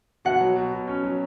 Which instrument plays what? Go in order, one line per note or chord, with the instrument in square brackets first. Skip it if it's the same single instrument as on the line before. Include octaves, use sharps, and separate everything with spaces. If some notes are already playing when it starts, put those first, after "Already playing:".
[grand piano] B2 [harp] F#5
[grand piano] F#3
B2
B2
C#4
F#3